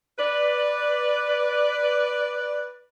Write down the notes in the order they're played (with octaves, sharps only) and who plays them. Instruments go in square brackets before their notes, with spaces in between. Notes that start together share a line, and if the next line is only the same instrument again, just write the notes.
[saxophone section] B4 D5